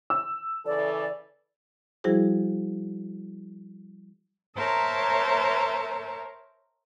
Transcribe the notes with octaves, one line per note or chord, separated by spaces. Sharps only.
E6
C#3 E3 A4 D5
F3 G3 E4 F#4 G#4 C5
A#4 C5 C#5 E5 A5 A#5